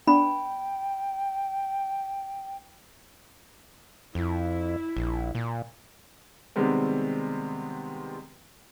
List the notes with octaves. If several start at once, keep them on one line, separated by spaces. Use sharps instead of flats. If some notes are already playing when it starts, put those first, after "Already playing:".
B3 D4 G5 B5
F2 E4
A#1
A#2
C3 D#3 G3 G#3 B3 C4